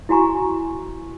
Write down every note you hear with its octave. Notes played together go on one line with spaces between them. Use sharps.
E4 F#4 G#5 A#5 C#6